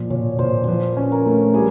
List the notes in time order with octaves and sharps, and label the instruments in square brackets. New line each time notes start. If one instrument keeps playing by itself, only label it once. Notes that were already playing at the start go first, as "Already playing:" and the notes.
Already playing: [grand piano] A#2 F3
[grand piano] A#2 [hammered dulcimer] C#5
[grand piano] A#2 [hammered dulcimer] C5
[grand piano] F3 [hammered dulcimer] B4 C5
[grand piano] C#4
[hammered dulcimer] A#4
[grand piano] A3
[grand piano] G3 [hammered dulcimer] G#4